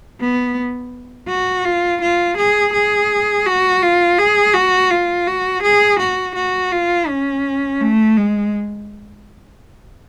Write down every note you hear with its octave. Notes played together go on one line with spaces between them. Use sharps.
B3
F#4
F4
F4
G#4
G#4
F#4
F4
G#4
F#4
F4
F#4
G#4
F#4
F#4
F4
C#4
A3
G#3